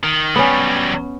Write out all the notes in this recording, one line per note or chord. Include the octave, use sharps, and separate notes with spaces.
D#3
F#3 G3 B3 C#4